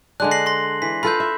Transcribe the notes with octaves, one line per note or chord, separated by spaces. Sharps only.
D3 G#3 D4 F#6
A#6 C7 F#7
C6 A#6
E3 B6
F4 A4 B4 B5 G6
E5